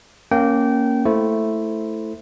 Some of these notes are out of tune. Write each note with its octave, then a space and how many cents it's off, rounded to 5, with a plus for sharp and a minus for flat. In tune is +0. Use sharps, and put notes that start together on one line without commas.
A#3 +0 C#4 +0 G5 -25
A3 +0 E4 +0 C5 +0